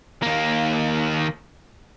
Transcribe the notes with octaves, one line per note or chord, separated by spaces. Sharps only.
D#2 A#3